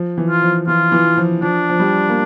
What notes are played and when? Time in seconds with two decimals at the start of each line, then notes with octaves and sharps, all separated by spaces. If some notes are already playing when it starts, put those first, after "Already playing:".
Already playing: F3
0.18 E3
0.30 F4
0.42 F3
0.67 E3 F4
0.92 E3
1.17 F3
1.42 F3 D4
1.70 F3
1.79 G3
2.09 A#3